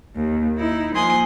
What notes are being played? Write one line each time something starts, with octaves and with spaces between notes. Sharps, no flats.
D#2
D#4 E4
F3 A#3 G#5 C6 D#6 F#6